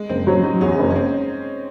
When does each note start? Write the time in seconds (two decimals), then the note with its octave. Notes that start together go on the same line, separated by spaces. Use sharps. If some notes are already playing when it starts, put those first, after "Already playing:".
Already playing: G#3
0.09 F#1 C4
0.27 F#3 C#4
0.43 F#3 D#4
0.61 E2 C#4
0.79 F#1
0.90 C#4
0.96 C4